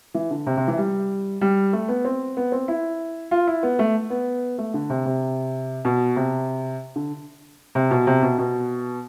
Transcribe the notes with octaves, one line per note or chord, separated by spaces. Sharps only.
E3
D3
C3
C3
E3
G3
G3
A3
B3
C4
B3
C4
E4
F4
E4
B3
A3
B3
A3
D3
C3
C3
B2
C3
D3
C3
B2
C3
B2
B2